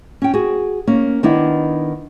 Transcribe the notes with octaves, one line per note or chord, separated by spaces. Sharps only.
C#4 G5
F#4 G#4
A#3 C#4
D#3 B3 D4 E4